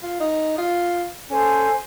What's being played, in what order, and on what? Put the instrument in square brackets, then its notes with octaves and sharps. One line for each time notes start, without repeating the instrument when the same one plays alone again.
[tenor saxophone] F4
D#4
F4
[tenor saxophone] C#4 [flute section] A4 C5 G#5